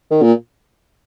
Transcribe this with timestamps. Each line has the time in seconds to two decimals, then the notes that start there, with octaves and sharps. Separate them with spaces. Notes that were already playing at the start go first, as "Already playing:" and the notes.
0.11 D#3
0.22 A#2